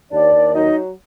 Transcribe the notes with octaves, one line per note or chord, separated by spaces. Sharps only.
D#2 D4 D5
D#2
F#3 D#4 D#5